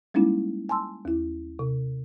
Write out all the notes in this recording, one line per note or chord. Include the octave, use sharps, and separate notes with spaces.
G3 G#3 A#3 C#4 D#4 E4
G#5 A5 C6 E6
D#2 E4
C3